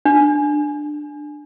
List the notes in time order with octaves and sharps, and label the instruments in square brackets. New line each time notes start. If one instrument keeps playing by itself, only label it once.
[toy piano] D4